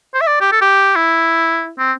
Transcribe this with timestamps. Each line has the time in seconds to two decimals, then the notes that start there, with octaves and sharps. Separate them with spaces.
0.14 C5
0.21 E5
0.27 D5
0.41 G4
0.52 A4
0.61 G4
0.96 E4
1.79 C4